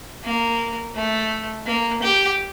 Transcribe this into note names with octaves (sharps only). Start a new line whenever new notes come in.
A#3
A3
A#3
G4